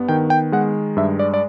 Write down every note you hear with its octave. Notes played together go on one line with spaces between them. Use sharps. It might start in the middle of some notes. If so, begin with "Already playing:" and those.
Already playing: G2 B3
D#3 G5
G5
G#3 F#5
G2 E5
D5
D5